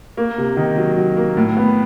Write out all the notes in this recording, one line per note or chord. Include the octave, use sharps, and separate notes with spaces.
A#3
C3
D#3
F#3
F#3
A#3
A2
B3